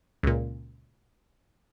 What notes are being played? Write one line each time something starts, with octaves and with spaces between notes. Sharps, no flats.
C#2 A#2